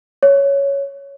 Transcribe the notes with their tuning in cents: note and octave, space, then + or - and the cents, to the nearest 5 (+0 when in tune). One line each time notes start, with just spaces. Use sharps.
C#5 +5